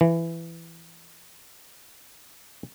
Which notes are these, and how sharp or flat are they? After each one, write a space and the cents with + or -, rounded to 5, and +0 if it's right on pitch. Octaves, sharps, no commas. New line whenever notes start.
E3 +15